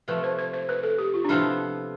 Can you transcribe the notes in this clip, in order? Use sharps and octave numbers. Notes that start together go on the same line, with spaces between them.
C3 F3 A3 B4
C5
C5
C5
B4
A4
G4
F4
D4
C3 F3 B3 E4 F4 A4